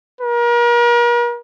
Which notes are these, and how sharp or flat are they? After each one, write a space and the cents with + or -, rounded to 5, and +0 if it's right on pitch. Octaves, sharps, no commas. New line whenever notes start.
A#4 +40